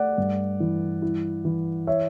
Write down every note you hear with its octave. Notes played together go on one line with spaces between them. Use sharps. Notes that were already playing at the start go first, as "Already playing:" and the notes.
Already playing: A3 D5 F#5
G2
E3
E4
E3
C#5 E5